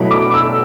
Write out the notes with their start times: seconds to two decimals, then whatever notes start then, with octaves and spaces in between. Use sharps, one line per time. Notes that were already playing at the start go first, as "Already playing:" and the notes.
Already playing: B2 F#3 A3 E4 B5
0.11 D6
0.34 E6